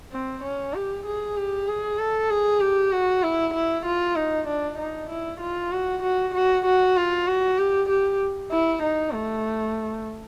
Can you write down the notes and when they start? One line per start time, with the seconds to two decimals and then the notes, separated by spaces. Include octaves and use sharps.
0.12 C4
0.44 C#4
0.74 G4
1.06 G#4
1.36 G4
1.68 G#4
1.99 A4
2.30 G#4
2.60 G4
2.92 F#4
3.23 E4
3.53 E4
3.86 F4
4.16 D#4
4.47 D4
4.78 D#4
5.10 E4
5.40 F4
5.72 F#4
6.02 F#4
6.34 F#4
6.65 F#4
6.97 F4
7.27 F#4
7.58 G4
7.89 G4
8.51 E4
8.83 D#4
9.14 A3